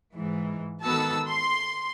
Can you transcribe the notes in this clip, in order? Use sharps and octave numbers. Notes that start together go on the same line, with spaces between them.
G#2 E3
D#3 B3 F#4 A4 A5 E6
C6